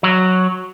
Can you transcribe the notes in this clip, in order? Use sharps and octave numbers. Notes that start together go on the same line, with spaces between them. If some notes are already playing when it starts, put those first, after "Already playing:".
F#3